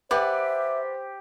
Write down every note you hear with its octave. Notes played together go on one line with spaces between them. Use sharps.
G4 B4 C5 D5 E5 F#5